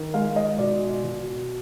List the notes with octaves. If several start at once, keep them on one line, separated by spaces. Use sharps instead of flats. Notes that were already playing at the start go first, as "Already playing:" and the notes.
Already playing: D#3
G#3 F5
D#5
B2 D5
B2